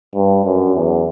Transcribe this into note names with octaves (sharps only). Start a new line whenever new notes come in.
G2
F#2
E2